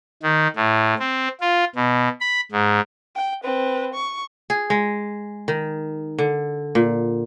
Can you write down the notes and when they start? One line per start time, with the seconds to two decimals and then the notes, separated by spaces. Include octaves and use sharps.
0.23 D#3
0.56 A2
0.99 C4
1.41 F4
1.76 B2
2.21 B5
2.52 G#2
3.15 G5
3.44 C4 B4
3.94 C#6
4.50 G#4
4.70 G#3
5.48 D#3
6.18 D3
6.75 A#2